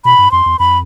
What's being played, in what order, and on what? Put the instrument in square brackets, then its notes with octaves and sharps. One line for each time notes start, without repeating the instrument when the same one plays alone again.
[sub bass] B2 [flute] B5
[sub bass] G2
[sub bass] F2 [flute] C6
[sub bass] E2
[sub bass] F2 [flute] B5